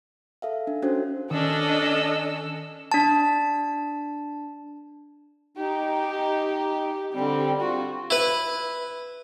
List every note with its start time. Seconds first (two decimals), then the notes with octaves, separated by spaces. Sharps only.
0.42 A4 E5 F5
0.67 D4
0.82 C#4 D4 F#4 A4 C5
1.31 D#3 C#4 D4 A4 D#5 E6
2.92 D4 A5
5.57 D#4 G4
7.14 D3 G3 C4
7.61 F4 F#4
8.10 E4 B4